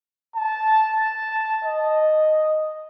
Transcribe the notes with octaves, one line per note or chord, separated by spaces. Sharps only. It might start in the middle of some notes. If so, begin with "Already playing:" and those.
A5
D#5